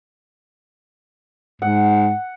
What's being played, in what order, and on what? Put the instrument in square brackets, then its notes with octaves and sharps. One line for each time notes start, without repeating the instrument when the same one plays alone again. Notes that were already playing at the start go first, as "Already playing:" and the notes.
[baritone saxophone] G#2 [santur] F#5